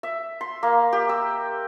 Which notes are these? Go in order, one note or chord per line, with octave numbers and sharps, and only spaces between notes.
E5
C6
A#3
G4
E6